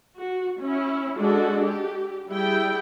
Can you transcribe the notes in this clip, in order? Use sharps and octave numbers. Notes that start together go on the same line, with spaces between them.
F#4
C#4 E4
G#3 D4 F#4 A4
G4
G3 E4 G#4 G5